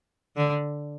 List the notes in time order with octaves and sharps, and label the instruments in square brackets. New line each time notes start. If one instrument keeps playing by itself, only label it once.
[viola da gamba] D3